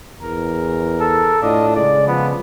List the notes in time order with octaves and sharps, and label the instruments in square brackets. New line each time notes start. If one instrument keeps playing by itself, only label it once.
[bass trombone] E2 [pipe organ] A#4
[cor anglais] A4
[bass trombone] A2 [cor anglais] D4 [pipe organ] F4 D#5
[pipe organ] C#3 G#3 [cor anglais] D5
[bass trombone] F3 [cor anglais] B3